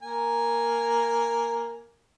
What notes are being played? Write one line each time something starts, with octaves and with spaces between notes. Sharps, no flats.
A#3 A#4 G#5